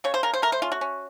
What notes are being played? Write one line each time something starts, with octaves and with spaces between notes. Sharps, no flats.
C#3 C#5
C5
C#3 A#4
C5
A3 A#4
C5
C#4 F4
F#4
C#4